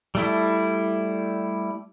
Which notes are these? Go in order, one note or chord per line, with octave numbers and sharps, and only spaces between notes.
G3 A3 E4